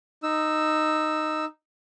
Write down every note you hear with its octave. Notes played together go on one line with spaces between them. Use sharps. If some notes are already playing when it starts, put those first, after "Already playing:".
D#4 E6